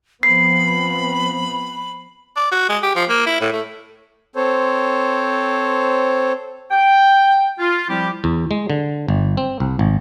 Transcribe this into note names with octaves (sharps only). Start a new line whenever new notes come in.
F3 B3 C4 B5 C7
D5
F#4
G#3
G4
F3
A#3
E4
A2
A3
C4 A4 C5 C#5
G5
F4
F3 G3 C4 E4 G4
E2
G#3
D3
G1
C4
C2
G#1